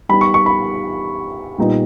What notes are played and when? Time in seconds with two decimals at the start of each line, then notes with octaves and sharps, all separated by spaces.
0.09 G3 B3 D#4 B5
0.21 C#6
0.34 C#6
0.46 B5
1.58 A#2 G3 B3 D#4